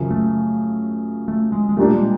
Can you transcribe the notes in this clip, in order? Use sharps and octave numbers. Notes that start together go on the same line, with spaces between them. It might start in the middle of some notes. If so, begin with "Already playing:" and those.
Already playing: F#2 C#3 F3
A3
A3
G#3
G#3
A#2 G3 A3 A#3 D4 G4
G#3